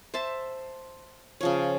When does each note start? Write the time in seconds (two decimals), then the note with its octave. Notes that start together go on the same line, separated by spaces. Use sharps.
0.14 C5 E5 A5
1.41 C#3 F3 C#5